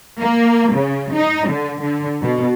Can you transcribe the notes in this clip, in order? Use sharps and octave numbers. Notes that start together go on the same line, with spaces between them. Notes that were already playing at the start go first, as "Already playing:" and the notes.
A#3
C#3
D#4
D3
D3
B2